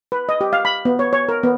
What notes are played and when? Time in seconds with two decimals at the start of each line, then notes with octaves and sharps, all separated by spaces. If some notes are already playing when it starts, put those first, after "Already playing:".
0.12 B4
0.29 D#5
0.41 G4
0.53 F5
0.65 B5
0.85 B3
0.99 C#5
1.13 C#5
1.29 A#4
1.43 B3